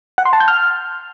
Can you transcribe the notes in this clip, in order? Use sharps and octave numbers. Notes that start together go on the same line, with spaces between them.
F#5
C6
A5
G6
F6